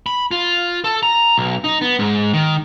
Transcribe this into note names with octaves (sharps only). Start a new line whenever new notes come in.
B5
F4
A4
A#5
B1
D#4
B3
G#2
D#3